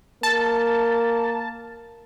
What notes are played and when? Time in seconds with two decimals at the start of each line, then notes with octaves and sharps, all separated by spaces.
0.23 A#3 A5